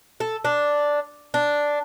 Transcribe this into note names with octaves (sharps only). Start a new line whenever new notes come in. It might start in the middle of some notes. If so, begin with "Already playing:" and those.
A4
D4
D4